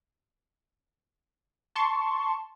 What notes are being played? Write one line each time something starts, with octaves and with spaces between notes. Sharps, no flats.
A5 C6 C#6